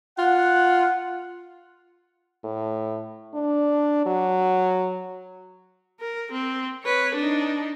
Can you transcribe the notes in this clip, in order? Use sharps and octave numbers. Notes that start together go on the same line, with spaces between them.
F4 F#5
A2
D4
F#3
A#4
C4
B4 C#5
D4 D#4